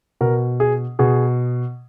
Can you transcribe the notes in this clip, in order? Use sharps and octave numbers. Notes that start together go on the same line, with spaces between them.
B2 A#4
G#4
B2 G#4